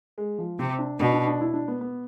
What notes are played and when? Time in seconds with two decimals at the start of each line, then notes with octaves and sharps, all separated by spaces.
0.18 G#3
0.38 F3
0.59 C3 C4
0.79 D4
0.99 B2 D4
1.13 D4
1.27 D4
1.41 E4
1.54 D4
1.68 B3
1.81 B3